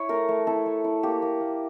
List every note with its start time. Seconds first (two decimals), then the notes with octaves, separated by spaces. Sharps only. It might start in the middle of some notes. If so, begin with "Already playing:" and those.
Already playing: E4 C#5
0.09 A3 A#4
0.29 A3
0.47 E4 A4
0.66 A3
0.84 E4
1.03 A#3 G4
1.22 A#3
1.41 A#3